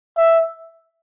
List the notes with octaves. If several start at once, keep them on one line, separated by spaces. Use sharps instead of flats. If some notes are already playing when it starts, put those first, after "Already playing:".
E5